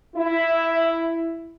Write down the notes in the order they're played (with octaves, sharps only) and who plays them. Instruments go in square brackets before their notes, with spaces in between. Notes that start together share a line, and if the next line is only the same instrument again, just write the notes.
[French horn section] E4